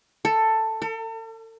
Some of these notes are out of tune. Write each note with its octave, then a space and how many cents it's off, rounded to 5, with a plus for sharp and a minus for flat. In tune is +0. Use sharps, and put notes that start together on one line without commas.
A4 +10
A4 +40